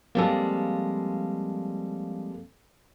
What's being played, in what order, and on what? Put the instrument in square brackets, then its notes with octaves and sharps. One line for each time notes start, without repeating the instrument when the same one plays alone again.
[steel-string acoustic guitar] F3 G3 G#3 [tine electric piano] A#3 C4 A4